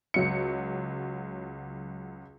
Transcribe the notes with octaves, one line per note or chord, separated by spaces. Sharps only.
C#2 F#3 C#7